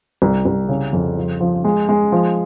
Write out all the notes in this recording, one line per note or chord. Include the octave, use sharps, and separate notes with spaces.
C2
C2
C#3
F2
F3
F3
G#3
G#3
F3